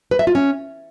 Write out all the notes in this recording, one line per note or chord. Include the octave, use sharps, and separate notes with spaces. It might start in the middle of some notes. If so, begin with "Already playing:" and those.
B4
E5
F4
C#4